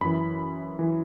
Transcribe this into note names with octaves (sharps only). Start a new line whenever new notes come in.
F#2 E3 B5
E3